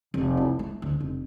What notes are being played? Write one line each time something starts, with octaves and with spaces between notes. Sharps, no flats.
F1
E4
A3
D2
F1